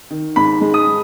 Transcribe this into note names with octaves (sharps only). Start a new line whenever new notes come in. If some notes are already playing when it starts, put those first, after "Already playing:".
D#3
G#2 B5
G#3
D#6